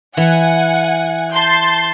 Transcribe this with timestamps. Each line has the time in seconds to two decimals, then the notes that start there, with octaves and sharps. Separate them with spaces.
0.17 E3 F#5 G#5
1.33 A5 C6 G6